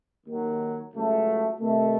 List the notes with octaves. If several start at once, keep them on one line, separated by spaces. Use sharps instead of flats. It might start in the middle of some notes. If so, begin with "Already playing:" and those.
D#2 D#3 F#3
C#2 C#3 F#3 A3
C3 D#3 A3